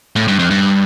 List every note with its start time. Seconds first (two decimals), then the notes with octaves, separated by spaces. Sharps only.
0.16 A2
0.28 G2
0.39 F2
0.51 G2